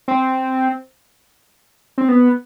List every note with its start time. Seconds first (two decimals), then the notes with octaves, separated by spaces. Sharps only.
0.08 C4
1.98 C4
2.09 B3